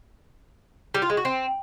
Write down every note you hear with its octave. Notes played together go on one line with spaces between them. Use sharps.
G3
F4
G#3
F#4
C4